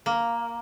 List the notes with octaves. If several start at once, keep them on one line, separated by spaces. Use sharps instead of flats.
A#3